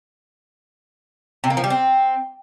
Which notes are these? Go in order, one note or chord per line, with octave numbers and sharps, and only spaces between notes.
C3
A#3
F3
G3
C4